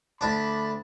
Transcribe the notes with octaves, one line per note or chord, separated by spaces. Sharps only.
D2 D4 B5